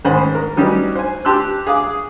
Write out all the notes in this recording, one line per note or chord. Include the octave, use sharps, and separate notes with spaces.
G#2 D#3 C#4 C5 B5
A#4
F#3 G3 C#4 D#4 G4
C5 G#5
G4 A5 C6 E6 F#6
G#4 F5 D6 D#6